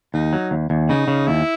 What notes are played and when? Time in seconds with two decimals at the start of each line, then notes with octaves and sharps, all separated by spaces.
0.14 D#2 D#4
0.33 F#3
0.51 D#2
0.70 D#2
0.89 C#3 D#4
1.08 C#3
1.27 D#2 E4